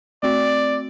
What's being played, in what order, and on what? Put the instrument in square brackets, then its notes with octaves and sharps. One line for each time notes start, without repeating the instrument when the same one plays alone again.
[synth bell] A3 C4 F#4 [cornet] D5